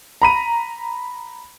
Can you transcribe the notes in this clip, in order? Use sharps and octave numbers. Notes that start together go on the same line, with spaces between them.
A#5 B5 D#7